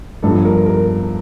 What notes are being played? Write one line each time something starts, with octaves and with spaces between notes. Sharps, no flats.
G1 G2 F3 A4
A#4
A#4